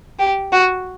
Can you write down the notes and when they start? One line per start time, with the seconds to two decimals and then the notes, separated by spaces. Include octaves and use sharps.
0.19 G4
0.52 F#4